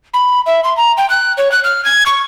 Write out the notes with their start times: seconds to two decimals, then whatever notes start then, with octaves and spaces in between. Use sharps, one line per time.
0.14 B5
0.46 E5
0.64 C6
0.77 A#5
0.97 G5
1.10 F#6
1.37 C#5
1.51 F#6
1.64 F6
1.85 G#6
2.06 C#6